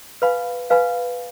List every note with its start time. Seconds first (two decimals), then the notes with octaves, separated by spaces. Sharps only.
0.22 B4 F5 G#5 B5
0.70 B4 F5 G#5 B5